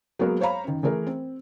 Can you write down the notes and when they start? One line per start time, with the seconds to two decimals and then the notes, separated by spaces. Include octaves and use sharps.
0.19 F#3 G#3 A#3 B3 F#4 A#4
0.40 C5 C#5 F5 A#5 B5
0.64 F#2 D#3
0.83 E3 A3 G#4 A#4
1.07 C4